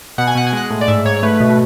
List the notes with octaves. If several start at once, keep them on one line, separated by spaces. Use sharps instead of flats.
B2 F#5
G#5
B2 F#5
G#5
G#3 F#5
A2
D5
G#2 E5
G#2 C#5
C#5
A3 B4
B2